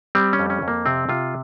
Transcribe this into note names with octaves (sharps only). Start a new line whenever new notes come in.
G3 C4
C#4
F2
C#4
F2
A#3
C3 C4
C3 F4